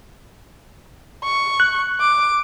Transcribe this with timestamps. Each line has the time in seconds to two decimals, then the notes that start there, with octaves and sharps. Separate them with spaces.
1.24 C#6
1.60 F#6
2.00 D6